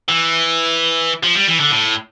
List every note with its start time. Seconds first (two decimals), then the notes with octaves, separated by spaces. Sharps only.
0.09 E3
1.23 F3
1.35 G3
1.47 E3
1.60 D3
1.72 A2